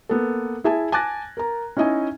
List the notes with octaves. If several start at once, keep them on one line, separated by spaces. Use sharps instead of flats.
A#3 B3 A4
E4 G#4 E5 G#5 A5
G#5 A5 D6 F#6 A6 A#6
A#4 A#5
C#4 D#4 E4 D#5 E5 G#5